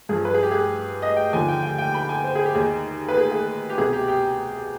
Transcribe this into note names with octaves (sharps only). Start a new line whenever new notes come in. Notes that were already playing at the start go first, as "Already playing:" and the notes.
G2 F3 G#4
B4
G#4
G4
G#4
D#5
G5
D#2 D3 F3 G#5
G5
G5
G5
B5
G#5
C5
G#4
G4
D#2 D#3 G#4
B4
G#4
G#4
G4
C2 B2 G#4
G4
G4